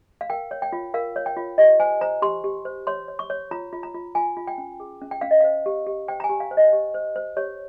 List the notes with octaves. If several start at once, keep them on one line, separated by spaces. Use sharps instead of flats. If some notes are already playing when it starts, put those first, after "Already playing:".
F5
A#4 G5
C#5
G5
F4
A#4 F5
C#5
G5
F4
G4 D#5
C5 G#5
C5 A#5
G4 C6
G4
C5
C#5 C6
C#5
C#6
C#5
F4 A#5
F4
A#5
F4
F4 G#5
F4
G5
C#4
G#4
C#4
G5
C#4 F5
D#5
C5 F5
G4
G4
C5 G5
A#5
G#5
G4
F5
C5
D#5
G4
C5
C5
G4 C#5